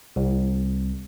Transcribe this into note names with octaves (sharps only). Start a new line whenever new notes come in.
C2